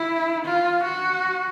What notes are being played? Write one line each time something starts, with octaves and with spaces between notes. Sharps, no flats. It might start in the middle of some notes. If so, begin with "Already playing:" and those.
Already playing: E4
F4
F#4